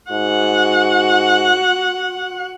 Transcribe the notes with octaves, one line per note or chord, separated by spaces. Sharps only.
G#2 F#4 F#5